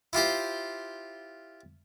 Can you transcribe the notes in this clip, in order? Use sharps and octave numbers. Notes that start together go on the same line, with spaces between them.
E4 F4 G4 C5